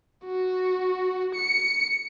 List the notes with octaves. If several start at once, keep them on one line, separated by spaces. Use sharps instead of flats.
F#4
C#7